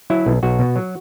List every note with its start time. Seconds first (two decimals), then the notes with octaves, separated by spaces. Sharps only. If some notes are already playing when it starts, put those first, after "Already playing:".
0.10 F#3 E4
0.26 B1
0.43 B1 F#4
0.59 B2
0.76 F#3